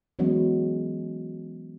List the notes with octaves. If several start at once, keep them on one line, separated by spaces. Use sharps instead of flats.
E3 F#3 G#3 B3 C#4